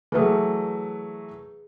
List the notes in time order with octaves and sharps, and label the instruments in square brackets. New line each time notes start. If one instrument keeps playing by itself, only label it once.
[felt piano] E3 F#3 A3 [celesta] G#4 B4 D#6